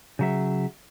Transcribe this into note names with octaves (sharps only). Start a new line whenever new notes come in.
C#3 F#3 E5